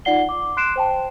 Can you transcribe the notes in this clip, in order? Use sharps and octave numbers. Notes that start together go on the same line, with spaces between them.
D#4 F4 D5 F#5 C7 G7
D6
C6 F#6 C7 D7 E7
C5 G5 A5